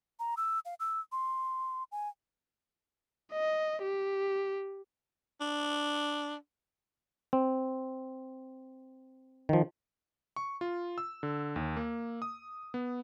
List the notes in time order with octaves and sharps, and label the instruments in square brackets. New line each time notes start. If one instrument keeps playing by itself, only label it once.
[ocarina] A#5
E6
F5
E6
C6
G#5
[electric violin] D#5
G4
[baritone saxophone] D4
[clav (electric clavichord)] C4
D#3 F3
[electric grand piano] C#6
F4
E6
D3
D#2
A#3
D#6
B3